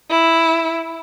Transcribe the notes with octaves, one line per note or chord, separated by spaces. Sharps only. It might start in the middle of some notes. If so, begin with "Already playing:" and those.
E4